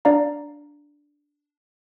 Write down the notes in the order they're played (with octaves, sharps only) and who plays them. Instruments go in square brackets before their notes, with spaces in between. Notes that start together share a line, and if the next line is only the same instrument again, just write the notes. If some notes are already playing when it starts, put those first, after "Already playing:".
[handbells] D4 D5 F5 A#5